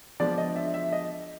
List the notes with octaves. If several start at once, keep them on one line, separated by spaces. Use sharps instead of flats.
F3 G#3 B3 D4 D5
D#5
E5
E5
D#5